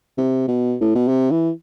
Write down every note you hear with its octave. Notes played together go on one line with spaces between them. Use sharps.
C3
B2
A2
B2
C3
E3